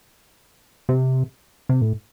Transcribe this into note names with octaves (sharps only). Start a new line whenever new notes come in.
C3
C3
A2